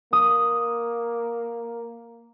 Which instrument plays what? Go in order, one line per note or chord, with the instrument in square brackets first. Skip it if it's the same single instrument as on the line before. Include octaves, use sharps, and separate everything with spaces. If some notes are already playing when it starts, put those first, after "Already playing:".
[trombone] A#3 [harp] D#6